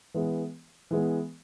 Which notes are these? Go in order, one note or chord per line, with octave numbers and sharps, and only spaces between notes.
E3 G#3 B3
E3 G#3 B3